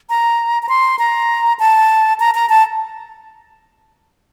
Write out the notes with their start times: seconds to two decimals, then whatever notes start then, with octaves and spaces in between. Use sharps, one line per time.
0.10 A#5
0.63 A#5
0.69 C6
0.99 A#5
1.59 A5
2.20 A#5
2.35 A#5
2.49 A5